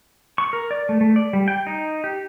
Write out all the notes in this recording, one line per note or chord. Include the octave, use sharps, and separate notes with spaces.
C#6
A#4
D5
A3
A3
D5
G3
G5
D#4
G4